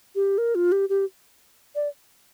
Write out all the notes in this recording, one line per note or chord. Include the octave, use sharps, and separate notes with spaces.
G4
A#4
F4
G4
G4
D5